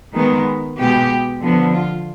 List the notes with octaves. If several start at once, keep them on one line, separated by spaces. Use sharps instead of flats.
D#3 G#3 B3
B2 G#3 B3 G4
D3 F3 B3
F4